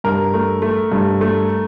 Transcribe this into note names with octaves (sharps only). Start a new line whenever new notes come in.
G2 A#4
A3
A3
G2
A3